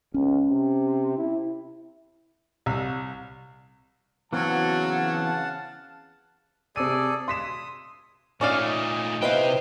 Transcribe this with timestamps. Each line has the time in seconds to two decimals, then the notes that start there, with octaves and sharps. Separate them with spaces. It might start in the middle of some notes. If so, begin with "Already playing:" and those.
0.14 C#2 C#4
0.51 C3
1.17 E4
2.66 C2
4.33 C#3 E3 F#3 B3 C4 F5 F#5 A5
6.76 C3 G#4 A4 D5 D#7
7.28 C6 D#6 B6 E7
8.41 A#2 A3 C#4 D#4 D5 F5
9.22 C3 E4 B4 C5 D#5 F5 G5